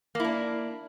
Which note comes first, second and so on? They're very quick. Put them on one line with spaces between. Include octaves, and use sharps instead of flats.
A#3 E4 D4